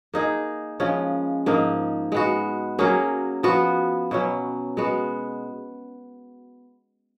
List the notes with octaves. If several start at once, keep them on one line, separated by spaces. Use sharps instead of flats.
A#3 D#4 G#4
C#3 F3 G#3 C#4
G#2 F3 A#3 D#4
G#3 B3 F#4
F#3 A#3 C#4 G#4
F3 B3 F#4
B2 F#3 C#4
G#3 B3 F#4